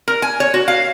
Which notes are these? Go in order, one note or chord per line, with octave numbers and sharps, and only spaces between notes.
A#4
G#5
C#5
F#4
F5